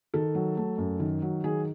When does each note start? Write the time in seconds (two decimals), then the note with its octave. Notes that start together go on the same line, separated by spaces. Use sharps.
0.14 D#3 A4
0.35 F#3
0.57 A3
0.78 F#2
1.00 D#3
1.22 F#3
1.44 D#3 G#4